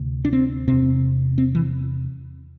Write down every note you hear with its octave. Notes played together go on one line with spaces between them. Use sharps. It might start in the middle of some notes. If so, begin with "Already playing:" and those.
Already playing: D2 C3
D4
C4
E2 C3 C4
C4
E3